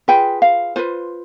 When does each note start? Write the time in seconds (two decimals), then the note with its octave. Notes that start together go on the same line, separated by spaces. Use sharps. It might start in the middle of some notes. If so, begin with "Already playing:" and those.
0.08 F4 G#4 B4 G5
0.42 F5
0.76 F4 B4 C5